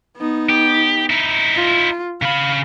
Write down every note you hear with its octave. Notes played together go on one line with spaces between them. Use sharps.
B3 D#4
G4
D#4 E4
F4
C#3 F5 B5